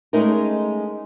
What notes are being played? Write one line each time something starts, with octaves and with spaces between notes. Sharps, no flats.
G#3 A3 C#4 D#4 A#4